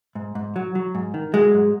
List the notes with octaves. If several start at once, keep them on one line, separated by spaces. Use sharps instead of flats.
G#2
G#2
F#3
F#3
G#2
D#3
F#3 G#3
G#2